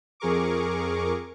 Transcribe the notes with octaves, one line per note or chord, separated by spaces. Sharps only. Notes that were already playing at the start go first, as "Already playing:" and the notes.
F2 G#4 A#4 C#6 D6